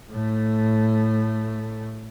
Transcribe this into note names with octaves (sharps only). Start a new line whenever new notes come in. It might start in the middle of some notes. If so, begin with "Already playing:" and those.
A2 A3